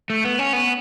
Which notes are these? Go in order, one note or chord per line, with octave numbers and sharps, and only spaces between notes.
A3
B3
C#4
B3